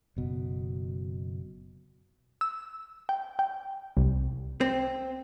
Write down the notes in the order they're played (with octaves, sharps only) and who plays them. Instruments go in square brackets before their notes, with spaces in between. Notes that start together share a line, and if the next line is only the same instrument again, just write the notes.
[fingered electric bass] F#1 B2
[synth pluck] E6
G5
G5
C2
[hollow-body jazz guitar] C4